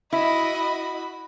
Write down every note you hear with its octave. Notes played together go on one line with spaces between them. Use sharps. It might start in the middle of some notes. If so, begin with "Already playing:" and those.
E4 F#4 D#5 B5